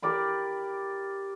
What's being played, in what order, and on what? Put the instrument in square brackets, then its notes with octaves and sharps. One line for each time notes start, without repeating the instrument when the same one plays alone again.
[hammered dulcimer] G4 A#4 D5 B5